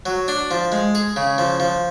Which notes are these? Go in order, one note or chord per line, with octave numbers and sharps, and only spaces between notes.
F#3
D4
F3
G#3
G#4
C#3
F3
F3